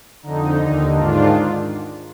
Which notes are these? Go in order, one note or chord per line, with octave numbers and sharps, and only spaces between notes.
F2 D3 D#4
D#2 D3
G#2 D#3 D4 F4